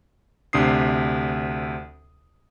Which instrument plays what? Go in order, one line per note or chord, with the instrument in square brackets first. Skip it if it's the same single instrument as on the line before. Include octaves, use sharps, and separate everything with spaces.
[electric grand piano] D2 C3 D4 D#6 C7